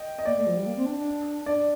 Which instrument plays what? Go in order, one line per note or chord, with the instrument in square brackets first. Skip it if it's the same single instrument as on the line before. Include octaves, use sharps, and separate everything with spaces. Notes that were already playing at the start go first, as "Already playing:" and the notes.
Already playing: [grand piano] D#5 G5
D#5
[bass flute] A#3 [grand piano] D5
[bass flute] A3
F3
G3
A#3
C4
D4
D4
[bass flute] D4 [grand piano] D5